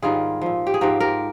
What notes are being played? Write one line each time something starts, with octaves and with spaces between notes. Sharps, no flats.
G#2 D#3 G3 F4 G#4
A#2 F3
G4
G#4
G#2 F3 G4 A#4
G4 A#4